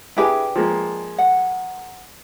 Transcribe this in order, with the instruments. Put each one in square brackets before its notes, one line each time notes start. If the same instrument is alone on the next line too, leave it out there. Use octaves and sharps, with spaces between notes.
[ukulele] D4 G4 B4 [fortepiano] E4 G#4 G#5
[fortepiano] F3 G#3 A#3
[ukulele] F#5